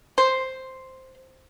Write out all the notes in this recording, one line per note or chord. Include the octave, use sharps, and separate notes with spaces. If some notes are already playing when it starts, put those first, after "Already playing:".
C5